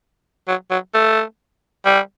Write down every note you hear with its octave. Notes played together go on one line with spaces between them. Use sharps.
F#3
F#3
A3
G3